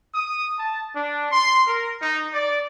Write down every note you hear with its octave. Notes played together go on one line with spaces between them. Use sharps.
D#6
A5
D4
C6
A#4
D#4
D5